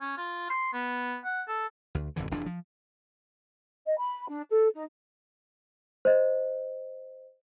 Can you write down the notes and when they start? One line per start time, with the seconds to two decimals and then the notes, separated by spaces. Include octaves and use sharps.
0.01 C#4
0.18 F4
0.50 C6
0.73 B3
1.25 F#5
1.48 A4
1.95 D2
2.16 G#1 F2 D3 E3
2.31 F1 E2 E3 D4
2.46 F3
3.86 D#5
3.99 B5
4.29 D4
4.51 A4
4.74 D#4
6.05 C5 D#5